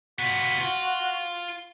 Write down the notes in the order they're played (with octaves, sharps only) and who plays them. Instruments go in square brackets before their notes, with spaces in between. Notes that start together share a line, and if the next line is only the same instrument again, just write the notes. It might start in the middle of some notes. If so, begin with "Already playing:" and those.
[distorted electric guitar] B3 F4 [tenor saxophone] F#4
[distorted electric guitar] F4